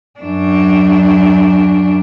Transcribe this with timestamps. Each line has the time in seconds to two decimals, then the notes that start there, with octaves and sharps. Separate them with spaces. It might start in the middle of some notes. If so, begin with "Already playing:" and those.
0.20 F#2 D4